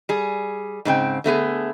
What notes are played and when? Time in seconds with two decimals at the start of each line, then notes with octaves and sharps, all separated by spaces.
0.09 G3 G#4
0.85 G#2 C#3 C4 G5
1.24 D3 A3 B3 G#4